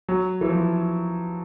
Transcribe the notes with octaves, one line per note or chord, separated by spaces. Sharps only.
F#3
E3
F3